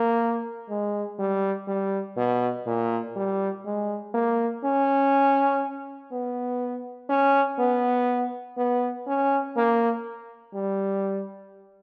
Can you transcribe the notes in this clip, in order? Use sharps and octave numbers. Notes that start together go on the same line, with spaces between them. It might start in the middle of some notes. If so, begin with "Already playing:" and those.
Already playing: A#3
G#3
G3
G3
B2
A#2
G3
G#3
A#3
C#4
B3
C#4
B3
B3
C#4
A#3
G3